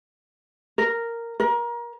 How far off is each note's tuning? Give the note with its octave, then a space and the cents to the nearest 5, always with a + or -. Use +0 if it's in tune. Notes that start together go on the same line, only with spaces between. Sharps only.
A#4 -5
A#4 +25